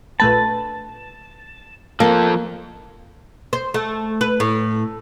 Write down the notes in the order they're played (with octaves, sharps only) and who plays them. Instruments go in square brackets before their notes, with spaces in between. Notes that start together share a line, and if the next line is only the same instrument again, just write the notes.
[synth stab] A#1 A3 B4 [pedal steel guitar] A5
[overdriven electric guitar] F3 A4 [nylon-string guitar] A#3
[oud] C5
A3
B4
A2